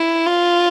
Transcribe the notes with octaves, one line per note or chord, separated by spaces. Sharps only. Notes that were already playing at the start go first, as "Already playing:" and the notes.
Already playing: E4
F4